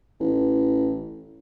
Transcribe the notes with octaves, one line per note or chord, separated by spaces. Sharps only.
A1